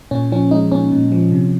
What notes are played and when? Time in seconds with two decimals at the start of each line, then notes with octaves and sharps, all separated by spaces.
0.11 A#2 C#4
0.32 F3 C#4
0.51 G#3 D#4
0.72 A#2 C#4
0.92 A#2
1.12 F3
1.31 C3